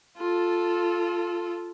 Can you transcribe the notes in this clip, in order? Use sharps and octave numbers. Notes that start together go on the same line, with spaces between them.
F4 A4